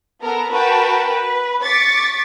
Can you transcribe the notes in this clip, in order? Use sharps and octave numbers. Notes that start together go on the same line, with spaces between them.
B3 A4 A#4 A#5
F#4 A#4 B4 G5 A5
B4
C#6 D6 A6 B6 C#7